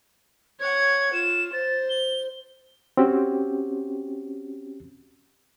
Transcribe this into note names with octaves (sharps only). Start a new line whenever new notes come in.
C#5 F#5 G#6
F4 E7
C5 A6
G7
C4 C#4 F#4 G4